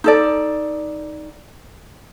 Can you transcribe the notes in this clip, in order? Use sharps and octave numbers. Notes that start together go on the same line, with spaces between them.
D#4 A4 D5